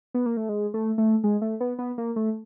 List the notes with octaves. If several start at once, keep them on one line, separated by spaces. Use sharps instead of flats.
B3
A#3
A3
G#3
A3
A3
G#3
A3
B3
B3
A#3
A3